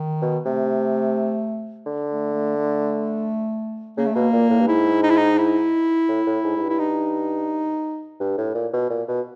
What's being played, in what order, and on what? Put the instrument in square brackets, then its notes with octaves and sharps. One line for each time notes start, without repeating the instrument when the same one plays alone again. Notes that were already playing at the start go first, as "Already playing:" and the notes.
Already playing: [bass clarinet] D#3
[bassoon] B2
[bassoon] C3 [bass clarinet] A3
[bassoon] D3
[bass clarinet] A3
A3
A3
[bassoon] C#3 [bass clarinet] A#3
[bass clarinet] A3
[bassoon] B2 [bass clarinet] A#3
[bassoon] A#2
A2
G2
[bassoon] G#2 [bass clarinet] E4
[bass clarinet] D#4
E4
D#4
E4
[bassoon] A2
A2
G#2
G#2
G2
[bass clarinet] E4
D#4
[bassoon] G2
A2
A#2
B2
A#2
B2